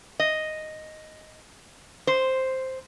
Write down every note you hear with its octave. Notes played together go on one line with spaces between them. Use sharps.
D#5
C5